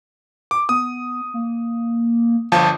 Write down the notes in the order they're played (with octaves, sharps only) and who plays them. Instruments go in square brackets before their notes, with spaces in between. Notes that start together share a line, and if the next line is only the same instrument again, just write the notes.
[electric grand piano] D6
[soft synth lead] B3 [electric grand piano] D#6
[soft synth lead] A#3
[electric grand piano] G1 F3 A5 [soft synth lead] F5